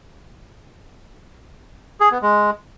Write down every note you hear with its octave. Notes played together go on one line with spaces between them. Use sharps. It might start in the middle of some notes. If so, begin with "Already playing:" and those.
G#4
B3
G#3